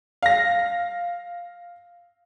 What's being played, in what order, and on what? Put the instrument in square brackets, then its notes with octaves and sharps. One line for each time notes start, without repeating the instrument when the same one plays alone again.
[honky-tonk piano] F5 A#6